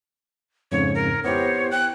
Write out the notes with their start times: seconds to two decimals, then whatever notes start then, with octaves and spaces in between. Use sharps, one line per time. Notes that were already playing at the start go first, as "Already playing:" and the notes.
0.72 F2 G#2 C#3 C#5
0.95 A#4
1.24 B3 E4 G4 C5 C#5
1.71 G5 F#6